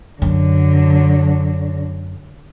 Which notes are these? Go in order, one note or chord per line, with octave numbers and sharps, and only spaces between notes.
F#2 D3 F#3